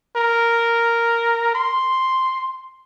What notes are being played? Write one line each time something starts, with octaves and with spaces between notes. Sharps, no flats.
A#4
C6